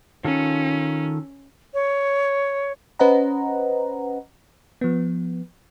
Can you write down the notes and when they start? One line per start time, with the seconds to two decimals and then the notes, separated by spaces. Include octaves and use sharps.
0.24 D#3 C#4 F4 A4
1.74 C#5
2.99 C#4 B4 C5 D#5 F#5 A#5
4.81 F3 B3